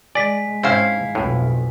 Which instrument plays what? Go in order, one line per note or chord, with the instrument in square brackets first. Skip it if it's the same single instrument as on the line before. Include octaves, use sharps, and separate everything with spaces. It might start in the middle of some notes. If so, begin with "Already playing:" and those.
[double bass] G#3 [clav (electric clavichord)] D5 [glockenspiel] G#5 B6
[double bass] G#2 [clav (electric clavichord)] C4 C#4 C5 [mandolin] E4 F5
[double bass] B1 F2 [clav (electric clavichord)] A2